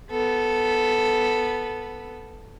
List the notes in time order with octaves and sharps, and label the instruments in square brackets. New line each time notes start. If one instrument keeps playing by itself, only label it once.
[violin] B3 A4